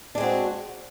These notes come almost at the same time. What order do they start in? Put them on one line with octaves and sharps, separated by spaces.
D4 G#3 C4 F#4